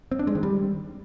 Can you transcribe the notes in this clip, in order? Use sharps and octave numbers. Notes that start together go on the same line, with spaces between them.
C4
D4
G#3
D#3
G3